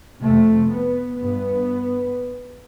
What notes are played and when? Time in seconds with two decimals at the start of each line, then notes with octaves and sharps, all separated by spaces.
0.21 F2 C3 A3
0.70 B3
1.20 G2 B3